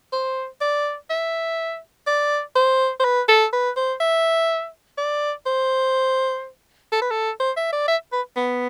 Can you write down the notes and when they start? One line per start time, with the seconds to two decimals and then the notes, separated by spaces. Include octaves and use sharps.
0.13 C5
0.61 D5
1.10 E5
2.07 D5
2.56 C5
3.00 C5
3.04 B4
3.29 A4
3.53 B4
3.77 C5
4.00 E5
4.98 D5
5.46 C5
6.92 A4
7.02 B4
7.11 A4
7.40 C5
7.57 E5
7.73 D5
7.88 E5
8.13 B4
8.36 B3